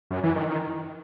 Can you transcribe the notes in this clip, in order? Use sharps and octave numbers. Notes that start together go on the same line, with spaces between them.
F#2
E3
D#3
D#3